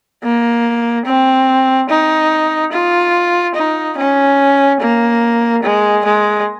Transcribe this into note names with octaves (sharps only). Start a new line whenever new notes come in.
A#3
C4
D#4
F4
D#4
C#4
A#3
G#3
G#3